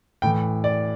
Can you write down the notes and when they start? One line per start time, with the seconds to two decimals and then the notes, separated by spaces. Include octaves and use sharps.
0.22 A2 E3 G5
0.64 D5